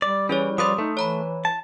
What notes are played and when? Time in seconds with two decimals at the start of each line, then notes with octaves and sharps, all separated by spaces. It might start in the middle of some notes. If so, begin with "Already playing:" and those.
0.02 G3 D5
0.29 E3 C#4 G#4 C#5
0.58 F3 B4 D5 C6 D#6
0.78 A3 D#4
0.97 E3 C#5 A#5 B5
1.45 A5